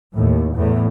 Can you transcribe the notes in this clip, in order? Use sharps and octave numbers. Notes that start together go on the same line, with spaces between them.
D#2 A2
E2 A2